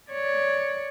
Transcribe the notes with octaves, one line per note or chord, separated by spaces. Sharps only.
C#5 D5